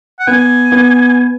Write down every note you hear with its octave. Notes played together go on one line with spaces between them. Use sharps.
F#5
B3 G#5
B3